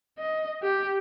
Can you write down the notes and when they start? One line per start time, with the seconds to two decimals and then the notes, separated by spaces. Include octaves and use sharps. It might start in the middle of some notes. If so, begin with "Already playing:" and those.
0.18 D#5
0.63 G4